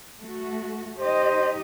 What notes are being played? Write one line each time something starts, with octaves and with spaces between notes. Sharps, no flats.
A3 F#4
D#4 G4 C5 D#5